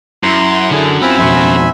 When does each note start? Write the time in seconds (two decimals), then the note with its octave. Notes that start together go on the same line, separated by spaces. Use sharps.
0.23 F#2 E4 A#5 C6
0.71 D3 G#4
1.02 B3 C4 E4 F4 G#5 B5 E6
1.19 F2 B2 F#4 C5 E5